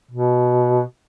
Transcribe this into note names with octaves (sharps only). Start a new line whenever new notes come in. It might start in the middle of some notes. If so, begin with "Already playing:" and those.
B2